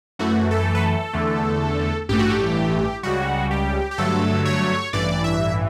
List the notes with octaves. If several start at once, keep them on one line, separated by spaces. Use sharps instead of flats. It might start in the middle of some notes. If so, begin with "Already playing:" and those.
F#2 E3 A3 F#4
A4
B4
A4
E2 D3 A3
A1 G2 E3 A3 G4
F#4
G4
C#2 C#3 G3 F#4
G4
G4
G2 D3 F#3 A3 A4
C#5
A1 G2 E3 D5
E5